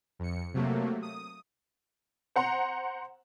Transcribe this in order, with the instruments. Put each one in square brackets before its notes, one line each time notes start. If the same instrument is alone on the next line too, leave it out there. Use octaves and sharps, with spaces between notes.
[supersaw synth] F2 C#7
C3 F#3 A3 A#3
D#6
[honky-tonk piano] C5 F#5 A#5 C6